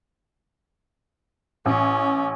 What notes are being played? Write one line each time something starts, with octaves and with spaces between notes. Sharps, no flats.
A1 C#4